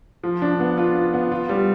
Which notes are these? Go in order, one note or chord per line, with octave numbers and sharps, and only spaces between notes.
F3
D4
B3
F4
F4
B3
F4
G3